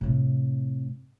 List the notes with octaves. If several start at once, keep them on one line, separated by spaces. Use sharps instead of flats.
A2 C3